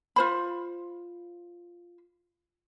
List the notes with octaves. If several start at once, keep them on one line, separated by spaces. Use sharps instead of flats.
F4 C5 B5